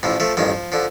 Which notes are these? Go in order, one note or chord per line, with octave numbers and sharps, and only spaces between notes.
A1 A2 F3
F3 A3
A1 G2 D#3 F3
D3 F3